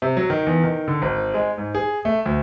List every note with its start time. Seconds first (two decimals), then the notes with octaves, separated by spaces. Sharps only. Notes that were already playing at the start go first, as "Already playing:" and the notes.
0.02 C3
0.17 F#3
0.30 D#3
0.47 E2
0.64 D#3
0.88 D3
1.02 G#1
1.34 G#3
1.58 G#2
1.75 G#4
2.05 A3
2.25 D2